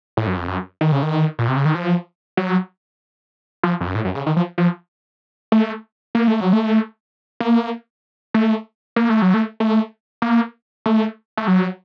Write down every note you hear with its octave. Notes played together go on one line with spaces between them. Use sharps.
A2
F#2
F2
F#2
D#3
C#3
D#3
A#2
C3
C#3
D#3
F3
F#3
F3
F2
F#2
A2
F#2
C#3
D#3
F3
F3
A3
A#3
A3
F#3
A3
A#3
A3
A#3
A3
F#3
A3
A3
A#3
A3
A3
F#3